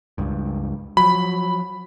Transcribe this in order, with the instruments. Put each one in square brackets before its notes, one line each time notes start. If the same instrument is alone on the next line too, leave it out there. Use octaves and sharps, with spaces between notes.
[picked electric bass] C#2 G2
[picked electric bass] F3 F#3 [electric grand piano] B5